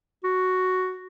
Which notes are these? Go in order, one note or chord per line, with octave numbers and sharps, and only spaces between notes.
F#4